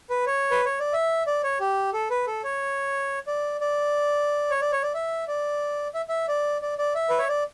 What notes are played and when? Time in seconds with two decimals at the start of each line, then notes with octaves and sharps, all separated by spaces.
0.10 B4
0.26 C#5
0.51 B4
0.65 C#5
0.80 D5
0.93 E5
1.27 D5
1.43 C#5
1.60 G4
1.93 A4
2.10 B4
2.27 A4
2.44 C#5
3.27 D5
3.61 D5
4.50 C#5
4.61 D5
4.72 C#5
4.83 D5
4.94 E5
5.28 D5
5.94 E5
6.09 E5
6.28 D5
6.62 D5
6.78 D5
6.95 E5
7.09 B4
7.18 C#5
7.29 D5